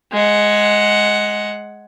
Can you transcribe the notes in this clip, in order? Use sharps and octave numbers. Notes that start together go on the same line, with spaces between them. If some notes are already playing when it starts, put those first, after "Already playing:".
G#3 F#5